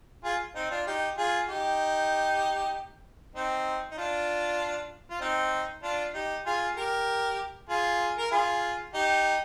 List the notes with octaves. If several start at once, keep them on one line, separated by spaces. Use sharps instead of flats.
F4 G#4
C4 D#4
D4 F4
D#4 G4
F4 G#4
D#4 G4
C4 D#4
D#4
D4 F4
F4
C4 D#4
D4 F4
D#4 G4
F4 G#4
G4 A#4
F4 G#4
A#4
F4 G#4
D#4 G4